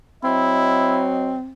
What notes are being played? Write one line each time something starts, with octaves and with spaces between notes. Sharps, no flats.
F#3 C4 E4 D#5